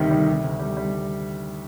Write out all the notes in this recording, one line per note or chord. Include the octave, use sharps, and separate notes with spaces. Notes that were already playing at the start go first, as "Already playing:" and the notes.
Already playing: D2 C3 D#3 G3
G3
C3
D2
G3
G3